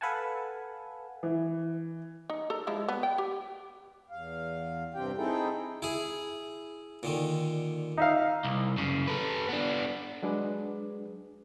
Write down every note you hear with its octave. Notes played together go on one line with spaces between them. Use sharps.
A4 B4 F5 F#5 G#5 A5
E3
D#4
A4 A#4 A#5
F3 G#3 E4
B3
G5
G4
E2 F5
G2 C3 C4 G4 G5
C4 D#4 E4 G#4 A4 G5
E4 G#4
A#2 D3 D#3
D#4 E5 F5
C2
F#2 C#3
A4 B4
B3 D4
F#3 G#3 D4 G#4 B4